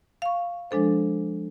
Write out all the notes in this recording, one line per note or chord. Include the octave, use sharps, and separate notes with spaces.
F5 C#6
F3 G#3 D4 A4 C5